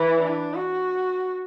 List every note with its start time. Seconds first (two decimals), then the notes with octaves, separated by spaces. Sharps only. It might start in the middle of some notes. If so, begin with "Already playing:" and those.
Already playing: E3
0.19 D4
0.54 F#4